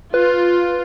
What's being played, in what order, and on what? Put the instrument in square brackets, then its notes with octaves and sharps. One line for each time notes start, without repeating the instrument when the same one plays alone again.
[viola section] F4 [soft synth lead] B4